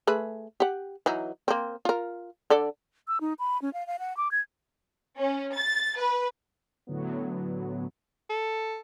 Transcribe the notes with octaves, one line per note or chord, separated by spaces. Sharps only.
A3 G#4 B4
G4 F#5
E3 F#3 D#4
A#3 C4
F4 A#4
D3 A4 D5
E6
D#4
B5
C#4
F5
F5
F#5
D6
G#6
C#4
A6
B4
A2 D3 F#3 B3
A4